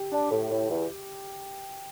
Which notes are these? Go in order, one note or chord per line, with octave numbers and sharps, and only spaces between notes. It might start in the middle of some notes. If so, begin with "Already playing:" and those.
Already playing: G4
D4
A2
A2
E2